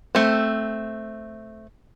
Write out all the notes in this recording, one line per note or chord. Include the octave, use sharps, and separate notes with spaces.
A3 C4